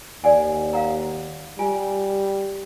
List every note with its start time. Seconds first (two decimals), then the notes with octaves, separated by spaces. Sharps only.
0.24 D#2 D5 F#5 G#5
0.73 F5 F#5 A#5
1.59 G3 F4 G#5